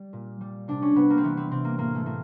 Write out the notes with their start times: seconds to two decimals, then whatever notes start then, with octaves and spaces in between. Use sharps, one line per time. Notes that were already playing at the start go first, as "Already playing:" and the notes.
Already playing: G3
0.13 A#2
0.41 G3
0.68 C3 D4
0.82 C#4
0.95 C3 B3
1.10 A#3
1.17 C4
1.24 E3 B3
1.37 C4
1.51 C3 C4
1.65 A#3
1.78 A2 A#3
1.95 A3
2.06 A2 A#3